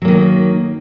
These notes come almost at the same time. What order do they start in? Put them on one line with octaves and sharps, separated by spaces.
F#3 A#3 D#3